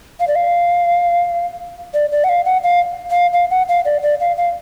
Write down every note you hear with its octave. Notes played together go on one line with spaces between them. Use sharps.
F5
D5
F5
D5
D5
F#5
F5
F#5
F5
F5
F5
F#5
F5
D5
D5
F5
F5